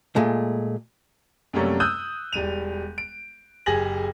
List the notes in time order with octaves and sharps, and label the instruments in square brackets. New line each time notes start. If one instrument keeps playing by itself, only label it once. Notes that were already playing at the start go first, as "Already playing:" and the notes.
[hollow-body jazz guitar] A#2 G#3 A3
[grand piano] F#2 C3 G3 A3 A#3 C#4
D#6 E6 F#6 G6 D#7
E1 G3 D#7 F7
D7
F#1 G4 G#4 G#5 A#6 F#7